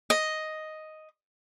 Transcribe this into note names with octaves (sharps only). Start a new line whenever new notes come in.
D#5